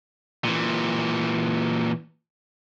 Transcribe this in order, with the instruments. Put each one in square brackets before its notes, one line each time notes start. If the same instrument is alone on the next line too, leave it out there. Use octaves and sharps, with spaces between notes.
[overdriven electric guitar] A#2 E3